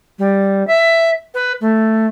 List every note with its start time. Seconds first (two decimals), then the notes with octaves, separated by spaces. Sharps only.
0.19 G3
0.67 E5
1.34 B4
1.61 A3